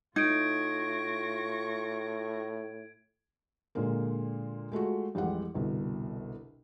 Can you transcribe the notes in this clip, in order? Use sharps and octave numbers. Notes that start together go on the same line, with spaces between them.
A2 D#4 F4 C#6 G#6 A#6 D7
A#2 D3 G#3 A#3
G#3 A3 F4 F#4
A1 F2 G3 G#3 F#5
G1 C2 B2